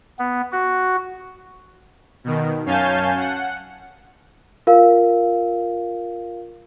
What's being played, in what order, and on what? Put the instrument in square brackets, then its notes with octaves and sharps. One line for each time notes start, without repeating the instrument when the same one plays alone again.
[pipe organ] B3
F#4
[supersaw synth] B2 D#3
F#2 C#4 F5 G#5 A5 G6
F#5
[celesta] F4 A#4 F5